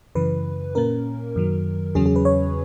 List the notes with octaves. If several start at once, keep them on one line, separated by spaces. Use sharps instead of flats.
F#2 C#3 E3 B4
A#2 A#3 C#4 A#4
F#2 D#3 F#3
E2 C#3 F#3 C#4 G#4
G#4
B4
C#5